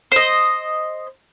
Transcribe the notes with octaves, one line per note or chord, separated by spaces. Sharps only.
C5 D#5